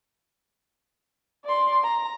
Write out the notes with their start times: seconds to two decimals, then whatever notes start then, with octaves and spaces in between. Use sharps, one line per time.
1.45 D5 C6
1.84 A#5